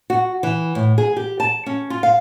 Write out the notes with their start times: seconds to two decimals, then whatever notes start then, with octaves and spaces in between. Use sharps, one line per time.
0.10 F#4
0.43 E3
0.75 A2
0.98 G#4
1.17 G4
1.40 A5
1.66 C#4
1.90 F4
2.03 F5